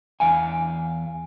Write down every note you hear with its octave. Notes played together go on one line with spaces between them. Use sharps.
E2 F5 G#5